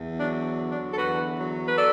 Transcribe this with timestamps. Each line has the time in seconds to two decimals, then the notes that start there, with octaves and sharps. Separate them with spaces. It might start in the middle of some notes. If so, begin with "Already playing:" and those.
Already playing: E2
0.19 F#3 D4
0.59 D3
0.71 D4
0.93 A4
0.97 E2 F#4 B4
1.38 F#3
1.68 B4
1.77 A4 D5